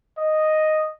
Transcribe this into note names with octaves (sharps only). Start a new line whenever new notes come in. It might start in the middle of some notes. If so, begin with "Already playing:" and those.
D#5